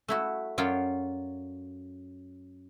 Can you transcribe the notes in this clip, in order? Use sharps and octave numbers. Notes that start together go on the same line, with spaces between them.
A3 E4 F#4
F#2 F#3 F4 C#5 D5 G5